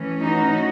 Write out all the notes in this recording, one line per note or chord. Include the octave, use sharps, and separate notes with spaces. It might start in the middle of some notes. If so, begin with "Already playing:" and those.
Already playing: E3 A3 C#4
D#4 F#4